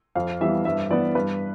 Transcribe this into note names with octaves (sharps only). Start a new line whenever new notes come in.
F2 F5
E3 G3 B3 E5
G2 E5
E3 B3 D5
G2 B4